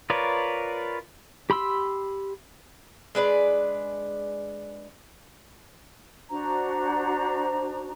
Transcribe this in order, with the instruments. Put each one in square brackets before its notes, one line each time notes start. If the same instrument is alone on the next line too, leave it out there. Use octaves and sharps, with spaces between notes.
[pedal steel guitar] F4 A#4 B4 C#5 D5
G4 B5 C6 E6
[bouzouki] G#3 D4 B4 D5
[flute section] D4 F#4 C5 A#5